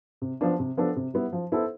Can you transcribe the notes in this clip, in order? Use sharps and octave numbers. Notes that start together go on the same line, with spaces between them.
C3
F3 B3 D4
C3
F3 B3 D4 A4
C3
G3 B3 E4
F3
B3 E4 A4 C5